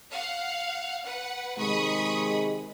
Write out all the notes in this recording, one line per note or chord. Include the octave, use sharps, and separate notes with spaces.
F5 F#5
B4 F#5
C3 D#3 G#3 B5 C#6 D#6